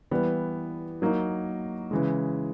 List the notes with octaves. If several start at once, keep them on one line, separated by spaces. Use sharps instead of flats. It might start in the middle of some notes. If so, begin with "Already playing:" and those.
E3 G3 B3
F#3 A#3 D#4
C#3 E3 G#3